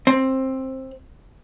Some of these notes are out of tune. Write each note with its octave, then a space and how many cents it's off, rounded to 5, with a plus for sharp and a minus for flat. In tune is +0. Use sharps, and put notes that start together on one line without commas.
C4 +15